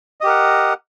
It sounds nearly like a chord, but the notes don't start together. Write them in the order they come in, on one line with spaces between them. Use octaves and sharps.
D#5 G4 A#4 F#5